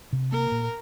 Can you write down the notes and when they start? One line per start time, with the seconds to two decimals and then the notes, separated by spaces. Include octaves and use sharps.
0.13 C3
0.32 A#3 A#4
0.52 A#2